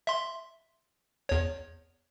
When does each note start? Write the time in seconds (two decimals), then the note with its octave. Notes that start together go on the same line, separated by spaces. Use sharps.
0.07 E5 C6
1.29 E2 C#5